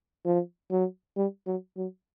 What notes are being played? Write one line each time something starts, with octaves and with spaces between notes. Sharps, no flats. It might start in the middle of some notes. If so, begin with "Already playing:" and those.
F3
F#3
G3
F#3
F#3